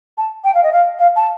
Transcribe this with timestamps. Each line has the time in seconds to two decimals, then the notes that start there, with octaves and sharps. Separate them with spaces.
0.18 A5
0.44 G5
0.55 F5
0.63 D#5
0.73 F5
0.99 F5
1.16 A5